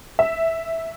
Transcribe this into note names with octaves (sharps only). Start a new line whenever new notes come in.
E5